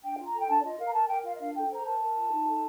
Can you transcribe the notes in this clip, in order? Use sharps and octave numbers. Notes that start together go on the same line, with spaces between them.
D4 G5
F4
A#5
A4
G5
D4 A5
D5
F4 D#5
A#4 F5
A#5
A#4 A5
A#4 G5
F4 F5
D#5
D4 F5
A4 G5
C5 A#5
A#4 A5
A#4
F4
D#4
A4